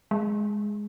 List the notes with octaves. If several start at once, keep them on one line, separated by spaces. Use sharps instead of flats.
G#3